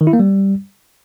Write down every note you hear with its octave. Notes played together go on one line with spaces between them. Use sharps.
D#3
E4
A#3
G3